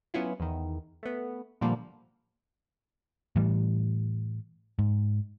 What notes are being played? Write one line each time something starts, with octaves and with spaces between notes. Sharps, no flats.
F#3 B3 C#4 E4 F4
E2 D#3
A3 B3
A#2 D3 F3 G3 A#3
A2 E3 G3
G#2